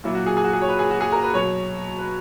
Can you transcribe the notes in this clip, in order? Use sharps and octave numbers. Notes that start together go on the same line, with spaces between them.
A#2 F#3 E4
F#4
G#4
G#4
F#4
G#4
C#5
B4
G#4
F#4
G#4
A#4
B4
B2 F#3 C#5
B4